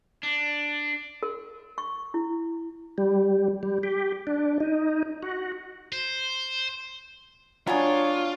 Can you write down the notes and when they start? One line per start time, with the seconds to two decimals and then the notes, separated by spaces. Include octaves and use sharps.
0.23 D4
1.23 A#4
1.78 C#6
2.14 E4
2.98 G3
3.63 G3
3.83 G4
4.27 D4
4.60 D#4
5.23 F#4
5.93 C5
7.67 F#3 G3 D4 F4 G#4 C#5